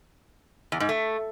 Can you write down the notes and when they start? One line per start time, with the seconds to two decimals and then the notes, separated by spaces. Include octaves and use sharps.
0.72 E2
0.80 G#2
0.89 A3